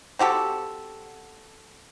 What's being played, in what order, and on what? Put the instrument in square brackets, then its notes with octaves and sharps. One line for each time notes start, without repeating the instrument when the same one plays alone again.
[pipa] C4 F#4 G4 A4